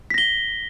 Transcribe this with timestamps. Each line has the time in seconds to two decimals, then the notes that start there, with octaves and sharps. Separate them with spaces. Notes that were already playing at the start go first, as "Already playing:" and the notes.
0.10 B6
0.14 A#6
0.18 G7